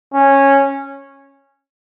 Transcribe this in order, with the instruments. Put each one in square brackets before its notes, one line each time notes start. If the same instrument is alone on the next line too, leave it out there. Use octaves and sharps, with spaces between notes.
[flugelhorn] C#4